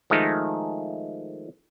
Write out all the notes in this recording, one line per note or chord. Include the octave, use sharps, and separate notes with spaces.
D#3 F3 G#3 A3 D#4